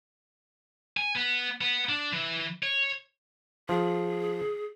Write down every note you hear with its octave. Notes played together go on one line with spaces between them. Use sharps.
G#5
B3
B3
D4
E3
C#5
F3 G#4